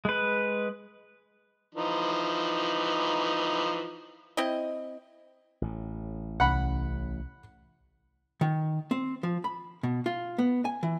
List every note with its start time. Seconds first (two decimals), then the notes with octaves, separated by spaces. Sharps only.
0.05 G#3 B4
1.75 E3 F3 D#4
4.37 C4 E4 D#5
5.62 A1 A2
6.40 C2 C#4 F#5 B5
8.41 D#3
8.91 C4
9.23 F3
9.44 B5
9.83 B2
10.06 F4
10.38 B3
10.65 G#5
10.83 E3